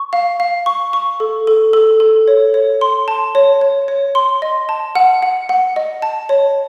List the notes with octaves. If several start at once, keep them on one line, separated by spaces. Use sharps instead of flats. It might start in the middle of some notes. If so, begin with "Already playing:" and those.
Already playing: C#6
F5
F5
C#6
C#6
A4
A4
A4
A4
C#5
C#5
C6
A5
C#5
C#5
C#5
C6
D#5
A5
F#5
F#5
F#5
D#5
A5
C#5